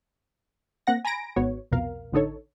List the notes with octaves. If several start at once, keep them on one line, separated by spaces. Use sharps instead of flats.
A#3 C4 F#5 A#6
G#5 A#5 B5 A#6 D7
G#1 G#2 B3 F#4 C#5
C2 F2 B2 A#4 F5
A1 D3 D#4 A4 C#5